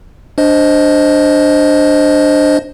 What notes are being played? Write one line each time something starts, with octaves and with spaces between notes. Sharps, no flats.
D4 C5 D#5